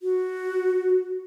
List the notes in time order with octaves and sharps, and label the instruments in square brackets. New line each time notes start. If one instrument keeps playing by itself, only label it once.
[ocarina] F#4